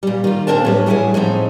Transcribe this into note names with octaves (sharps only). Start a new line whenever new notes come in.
A#2 G3
D#3 F4
A#2 A#3 C4 D4 A#4 A5
A2 G3 B4
E2 A2 G3 E4 G#4 F#5
A2 F3 C4 D#4